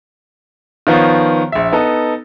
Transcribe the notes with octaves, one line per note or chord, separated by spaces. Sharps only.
D#3 F3 B3 F4 C#5
A#1 E5
B3 D#4 A4